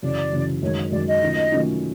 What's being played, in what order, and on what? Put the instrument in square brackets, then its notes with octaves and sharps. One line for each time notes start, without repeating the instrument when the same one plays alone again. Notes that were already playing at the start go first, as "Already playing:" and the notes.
[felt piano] F#2 C#3 E3 [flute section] D5
[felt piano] F#2 C#3 E3
[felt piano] F#2 D#3 G#3 [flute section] C#5
[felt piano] F#2 D#3 G#3 [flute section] D5
[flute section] D#5
[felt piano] D#3 F#3 A3 C#4 F4
D#3 F#3 A3 C#4 F4